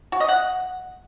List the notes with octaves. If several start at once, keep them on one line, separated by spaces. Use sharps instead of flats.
F#4
D#5
F#5